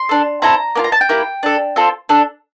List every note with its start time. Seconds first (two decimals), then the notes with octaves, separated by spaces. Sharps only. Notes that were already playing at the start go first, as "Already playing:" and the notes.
Already playing: C6
0.09 D4 A4
0.42 C4 E4 A4 A#5
0.75 A#3 D4 F4
0.84 A#5
0.92 A5
1.01 G5
1.09 A#3 E4 G4
1.43 D4 A4
1.76 C4 F4 A4
2.09 D4 A4